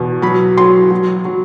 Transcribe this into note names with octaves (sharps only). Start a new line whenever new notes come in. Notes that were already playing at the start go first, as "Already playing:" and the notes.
Already playing: E2 B2
F#3 B5
F#3 C6
F#3
F#3